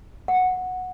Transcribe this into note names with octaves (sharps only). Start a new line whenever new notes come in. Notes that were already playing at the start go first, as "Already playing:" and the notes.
F#5